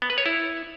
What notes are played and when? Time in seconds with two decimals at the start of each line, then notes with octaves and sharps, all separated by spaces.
0.02 B3
0.10 B4
0.18 C#5
0.26 E4